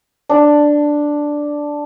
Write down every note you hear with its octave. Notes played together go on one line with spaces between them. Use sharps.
D4